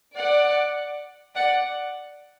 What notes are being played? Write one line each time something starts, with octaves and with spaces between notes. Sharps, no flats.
D5 F#5
D5 F#5